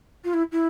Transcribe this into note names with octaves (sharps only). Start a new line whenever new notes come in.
F4
E4
E4